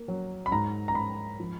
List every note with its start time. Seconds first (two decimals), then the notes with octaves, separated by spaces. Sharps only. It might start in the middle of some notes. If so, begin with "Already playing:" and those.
Already playing: A#3
0.08 F#3
0.46 B5
0.52 G#2 A#5
0.88 A#5
0.95 G#2 B5
1.40 F3